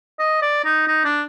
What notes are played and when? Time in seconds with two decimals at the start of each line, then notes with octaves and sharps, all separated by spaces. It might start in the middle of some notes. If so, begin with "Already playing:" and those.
0.19 D#5
0.42 D5
0.65 D#4
0.87 D#4
1.04 D4